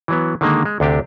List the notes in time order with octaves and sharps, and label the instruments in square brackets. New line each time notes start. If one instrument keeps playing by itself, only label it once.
[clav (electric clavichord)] E3 F#3 B3
D3 D#3 G#3 A#3
G#3
D2 C3 D4 G4